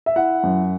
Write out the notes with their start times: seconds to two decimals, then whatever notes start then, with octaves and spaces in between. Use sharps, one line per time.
0.06 E5
0.16 E4 F#5
0.43 F#2